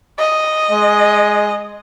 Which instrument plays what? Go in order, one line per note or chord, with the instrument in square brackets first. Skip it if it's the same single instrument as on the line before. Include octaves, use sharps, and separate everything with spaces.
[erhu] D#5
[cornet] G#3